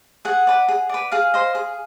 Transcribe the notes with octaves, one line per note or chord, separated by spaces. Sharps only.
G#4 F#5
B4 D5
G#4
B4 D5
G#4 F5
C5 D#5
G#4